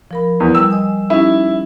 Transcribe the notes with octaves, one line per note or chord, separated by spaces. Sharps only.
F3 A#4 B5
E2
G3 E6
D#5 G#5 D#6
C#4 D#4 E4 G4